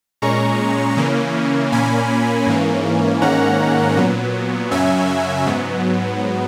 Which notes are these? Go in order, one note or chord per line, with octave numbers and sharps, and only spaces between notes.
A#2 G#3 C#4 A#5 C#6
C#3 E3 A#3 C#4
A#2 A#3 C#4 G#5 B5
G#2 E3 A#3 C#4
G#2 D#3 A#3 C#4 F#5 A#5
A#2 F#3 B3
F#2 C#3 F#3 C#4 E5 G#5
G#2 F#3 B3